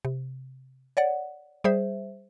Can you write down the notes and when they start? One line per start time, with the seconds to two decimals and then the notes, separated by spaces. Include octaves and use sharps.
0.05 C3
0.97 C#5 D5 F#5
1.64 G3 G#4 C5 E5